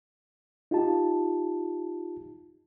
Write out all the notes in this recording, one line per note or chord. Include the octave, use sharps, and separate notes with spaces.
D#4 F4 G4 A5